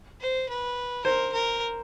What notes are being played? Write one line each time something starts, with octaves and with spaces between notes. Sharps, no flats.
C5
B4
A#4 C5
A#4